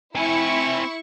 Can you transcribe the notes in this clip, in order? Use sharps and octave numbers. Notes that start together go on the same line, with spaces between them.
C4 E4 G#5 C#6